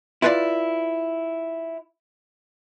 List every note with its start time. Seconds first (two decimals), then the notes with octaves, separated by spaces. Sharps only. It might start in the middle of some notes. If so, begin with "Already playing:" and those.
0.22 E4 F4 B4 C#5 D5 F5